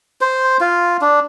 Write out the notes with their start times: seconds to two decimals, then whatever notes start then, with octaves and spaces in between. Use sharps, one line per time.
0.21 C5
0.61 F4
1.01 D4